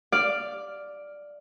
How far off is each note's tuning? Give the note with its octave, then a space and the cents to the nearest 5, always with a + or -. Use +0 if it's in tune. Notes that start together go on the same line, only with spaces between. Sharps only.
D5 +0 F5 +0